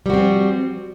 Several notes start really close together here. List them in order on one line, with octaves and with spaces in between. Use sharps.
G3 F#4 C4 F3